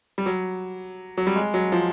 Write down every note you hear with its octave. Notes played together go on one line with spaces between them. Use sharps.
G3
F#3
F#3
G3
G#3
F#3
F3